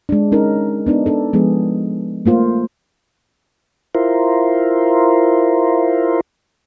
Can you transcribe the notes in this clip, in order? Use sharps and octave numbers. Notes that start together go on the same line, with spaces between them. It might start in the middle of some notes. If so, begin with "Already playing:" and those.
G#3 D4
C#4 D#4 A#4
B3 D4 D#4
D4 A4
F3 G#3 B3 G#4
A3 A#3 F4 C5
E4 F4 A#4 C5